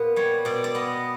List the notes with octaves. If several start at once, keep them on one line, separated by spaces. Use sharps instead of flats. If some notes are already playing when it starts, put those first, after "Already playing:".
Already playing: A#2 B3 B4
G3 C#5
B2 D5
D5
B3 D#5